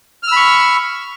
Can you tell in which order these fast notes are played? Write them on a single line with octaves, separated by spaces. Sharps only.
F6 E6 B5 C#6